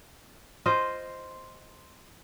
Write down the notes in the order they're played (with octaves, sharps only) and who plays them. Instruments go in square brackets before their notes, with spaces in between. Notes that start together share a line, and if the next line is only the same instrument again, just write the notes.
[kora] F4 C5 D#5